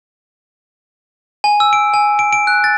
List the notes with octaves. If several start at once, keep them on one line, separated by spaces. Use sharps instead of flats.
G#5
E6
D7
G#5
D7
D7
F#6
A6